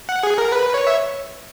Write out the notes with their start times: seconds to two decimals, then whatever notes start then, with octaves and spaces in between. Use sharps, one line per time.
0.09 F#5
0.23 G#4
0.38 A#4
0.52 B4
0.74 C#5
0.87 E5